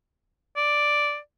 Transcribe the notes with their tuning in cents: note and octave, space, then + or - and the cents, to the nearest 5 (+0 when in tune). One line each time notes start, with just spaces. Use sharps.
D5 +0